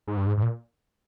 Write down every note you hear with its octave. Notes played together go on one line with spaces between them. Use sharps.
G#2
G2
G#2
G#2
A#2